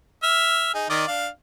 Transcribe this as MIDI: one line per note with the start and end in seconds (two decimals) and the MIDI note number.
0.23 0.70 76
0.23 0.70 89
0.74 0.88 63
0.74 0.88 68
0.90 1.06 51
0.90 1.06 74
0.90 1.06 75
1.08 1.28 62
1.08 1.28 77